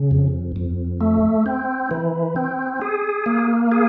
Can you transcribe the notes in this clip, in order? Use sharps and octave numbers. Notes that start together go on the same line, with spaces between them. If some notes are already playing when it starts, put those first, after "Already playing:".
Already playing: C#3
F2
F2
A3
C4
E3
C4
G#4
A#3
G#4